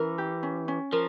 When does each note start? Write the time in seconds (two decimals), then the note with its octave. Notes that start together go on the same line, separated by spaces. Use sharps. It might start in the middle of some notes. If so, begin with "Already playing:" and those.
Already playing: E3 C#4 A#4
0.18 G4
0.43 C#4
0.68 C#4
0.92 F3 A#4